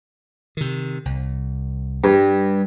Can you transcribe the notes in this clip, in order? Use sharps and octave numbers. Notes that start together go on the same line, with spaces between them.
C3 D#3
C2
G2 G3